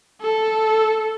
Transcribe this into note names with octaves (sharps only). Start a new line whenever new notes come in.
A4